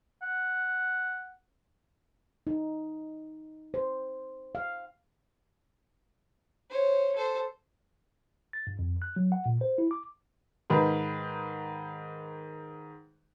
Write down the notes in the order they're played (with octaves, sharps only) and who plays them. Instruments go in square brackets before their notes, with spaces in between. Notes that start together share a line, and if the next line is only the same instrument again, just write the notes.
[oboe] F#5
[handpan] D#4
C5
F5
[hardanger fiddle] C5 C#5
A4 C5
[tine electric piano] A6
G2
F2
F#6
F#3
F#5
A#2
C5
E4
D6
[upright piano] G#2 D#3 B4